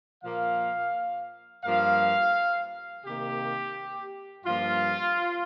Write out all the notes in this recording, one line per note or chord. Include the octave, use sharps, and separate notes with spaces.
A#2 F3 A#3 F5
G2 F3 A#3 F5
C3 D#3 A#3 G4
G2 F3 A#3 F4